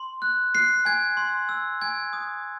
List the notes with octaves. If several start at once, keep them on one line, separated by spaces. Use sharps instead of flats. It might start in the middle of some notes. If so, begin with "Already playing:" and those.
Already playing: C6
F#6
F#6 C7
G#5 G#6
C6
E6
G#5 G#6
D#6